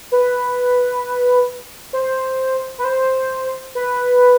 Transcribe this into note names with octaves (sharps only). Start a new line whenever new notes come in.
B4
C5
B4
C5
B4